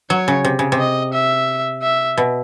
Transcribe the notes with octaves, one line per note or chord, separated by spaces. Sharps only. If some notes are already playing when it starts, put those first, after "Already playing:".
F#3 C#5
C#3
C3
C#3
C3
D#5
E5
E5
B2